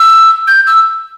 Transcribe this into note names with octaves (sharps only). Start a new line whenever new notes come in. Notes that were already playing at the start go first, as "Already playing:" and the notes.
Already playing: E6
G6
E6